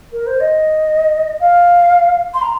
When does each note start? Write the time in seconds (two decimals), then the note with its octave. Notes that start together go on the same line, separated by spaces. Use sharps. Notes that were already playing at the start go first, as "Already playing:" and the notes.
0.12 A#4
0.27 C5
0.40 D#5
1.40 F5
2.34 C6
2.42 A#5